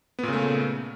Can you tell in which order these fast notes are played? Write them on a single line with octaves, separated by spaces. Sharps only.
B3 A#2 C#3 A3